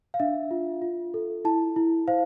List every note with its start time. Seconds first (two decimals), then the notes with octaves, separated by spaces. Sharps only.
0.14 F5
0.20 D4 E5
0.51 F4
0.82 F4
1.14 A4
1.45 E4 A5
1.76 E4
2.08 C5 F5